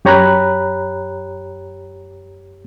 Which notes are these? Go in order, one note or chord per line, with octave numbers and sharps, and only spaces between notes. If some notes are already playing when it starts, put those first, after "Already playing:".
F#2 G4 C#5 A#5 B5 F#6